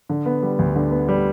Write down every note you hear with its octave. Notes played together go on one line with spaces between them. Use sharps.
D3
B3
G3
D2
D3
B3
G3